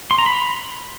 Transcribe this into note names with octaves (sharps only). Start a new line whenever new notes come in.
C6
A#5
B5